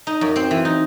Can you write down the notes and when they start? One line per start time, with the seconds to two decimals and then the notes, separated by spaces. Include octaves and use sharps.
0.07 D#4
0.21 F#2
0.36 C4
0.51 E3
0.65 D#4